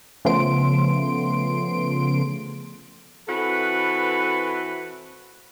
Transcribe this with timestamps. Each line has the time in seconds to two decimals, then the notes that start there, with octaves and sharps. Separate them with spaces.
0.25 C#3 F3 A3 B3 C6 D7
3.28 E3 C4 F#4 A4 B4